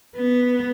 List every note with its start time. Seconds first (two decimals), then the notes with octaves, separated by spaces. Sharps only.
0.17 B3